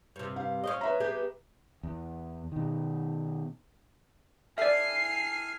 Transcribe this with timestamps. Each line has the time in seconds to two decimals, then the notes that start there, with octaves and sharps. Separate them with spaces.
0.16 G2 C3
0.36 F5
0.64 C#4 C5 D#5
0.81 B4 E5 A#5
1.00 B3 G4 G#4
1.83 E2
2.52 B2 D#3
4.58 E4 G4 A4 D5 E5 G#5 F6 C7